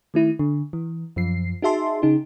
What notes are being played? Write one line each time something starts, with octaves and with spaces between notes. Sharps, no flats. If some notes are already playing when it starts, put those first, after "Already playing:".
D#3 A3 E4
D3
E3
F#2 F3 C7
D#4 F#4 G#4 E5 A5 C6
C#3 D#4 G#4